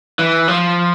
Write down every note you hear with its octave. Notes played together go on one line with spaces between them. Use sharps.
E3
F3